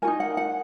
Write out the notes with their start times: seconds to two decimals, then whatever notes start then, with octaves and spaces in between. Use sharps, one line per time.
0.02 F#4 A#4 G#5
0.07 D#4
0.20 F#5
0.37 F#5